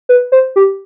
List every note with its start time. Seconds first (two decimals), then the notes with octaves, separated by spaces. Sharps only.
0.09 B4
0.32 C5
0.56 G4